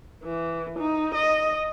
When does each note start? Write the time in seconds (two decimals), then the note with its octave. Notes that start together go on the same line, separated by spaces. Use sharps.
0.24 E3
0.78 D#4
1.14 D#5